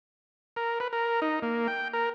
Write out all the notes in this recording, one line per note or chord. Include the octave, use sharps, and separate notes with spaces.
A#4
B4
A#4
D#4
A#3
G5
A#4